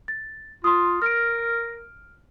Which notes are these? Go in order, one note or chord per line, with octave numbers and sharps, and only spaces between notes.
A6
F4 C6 D#6
A#4 F6 D7